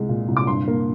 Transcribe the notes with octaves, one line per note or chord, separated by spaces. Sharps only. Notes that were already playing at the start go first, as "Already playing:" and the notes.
Already playing: C2 G#3
A#2
C2
D6
G2 C6
A#3